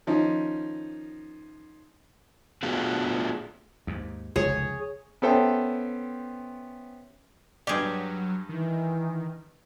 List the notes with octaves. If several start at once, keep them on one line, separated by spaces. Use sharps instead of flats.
D#3 F3 C#4 D#4
A3 B3 D4 F4 F#4 G#4
D#2 G#2
F1 C#2 G#4 C#5
B3 C#4 A4 C5 E5 G5
G2 F#3 G4 G#4 D5
D#3 E3